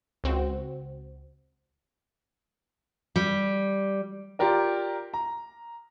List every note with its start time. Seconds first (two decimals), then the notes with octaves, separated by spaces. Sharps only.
0.24 C#2 C4 F#4
3.16 G3
4.39 F4 G4 A#4 D5
5.14 A#5